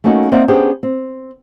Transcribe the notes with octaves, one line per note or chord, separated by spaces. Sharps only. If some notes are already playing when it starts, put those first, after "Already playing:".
A3 A#3 C#4 D#4 F#4
A#3 C4 D#4 D5 E5 F#5
B3 C#4 D4 G4 G#4 C5
C4